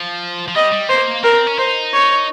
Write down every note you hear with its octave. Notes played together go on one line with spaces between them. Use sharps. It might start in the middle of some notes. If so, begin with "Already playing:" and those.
Already playing: F3
F3
G3 D#5
G3
A#3 C5
C4 A#4
C4
C#4
D#4 C5
C#5